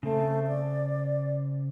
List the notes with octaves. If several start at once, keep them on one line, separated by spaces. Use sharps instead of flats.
C#3 A3 C4
D5